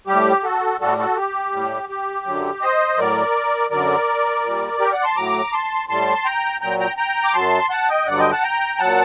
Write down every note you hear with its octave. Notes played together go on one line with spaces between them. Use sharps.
A2 G3 G4
F#4 A4
A2 G3 F#4 A4
F#4 A4
G4
A2 G3
G4
F#2 D3 F#3
C5 D#5
A2 F#3 A#4 D5
F#2 D3 F#3 A#4 D5
A#2 G3
G4 A#4
D5 F#5
A5 C6
A2 F#3 A#5 D6
A5 C6
A2 G3 A5 C6
G5 A#5
A#2 F#3 G5 A#5
G5 A#5
G5 A#5
D6
F#2 F#3 A5 C6
F#5 A5
D#5 G5
G2 D3 F#3 D5 F#5
D#5 G5
F#5 A5
G5 A#5
A#2 F#3 F#5 A5